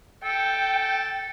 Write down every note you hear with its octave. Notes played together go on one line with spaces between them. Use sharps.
A4 G5